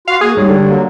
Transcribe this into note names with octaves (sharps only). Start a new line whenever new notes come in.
F4 F#4 F5
A#3 F#4 G#4
G#2 G3 C#5
D3
F#3 A#3